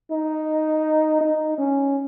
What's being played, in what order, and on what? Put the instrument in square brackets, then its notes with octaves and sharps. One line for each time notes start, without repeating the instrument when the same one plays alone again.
[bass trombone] D#4
D#4
C#4